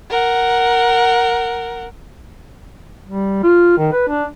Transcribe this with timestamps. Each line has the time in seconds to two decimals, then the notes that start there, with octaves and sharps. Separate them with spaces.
0.11 A#4 F#5
3.06 G3
3.43 F4
3.78 D#3
3.92 B4
4.08 D4